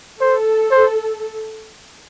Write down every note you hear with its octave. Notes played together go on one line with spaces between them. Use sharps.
A4 C5
C5